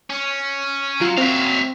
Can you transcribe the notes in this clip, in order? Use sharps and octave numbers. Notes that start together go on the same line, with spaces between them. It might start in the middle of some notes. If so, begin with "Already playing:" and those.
C#4
F#3 F4
F#3 A#3 C4 E5 F5